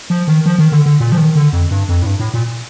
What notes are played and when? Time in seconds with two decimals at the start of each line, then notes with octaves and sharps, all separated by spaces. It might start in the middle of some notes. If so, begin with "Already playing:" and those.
0.10 F3
0.28 D#3
0.46 F3
0.58 D#3
0.72 D3
0.86 D3
1.00 A#2
1.12 F3
1.17 D#3
1.35 D3
1.53 F2
1.71 G2
1.89 F2
2.02 A2
2.06 G2
2.19 A2
2.34 A#2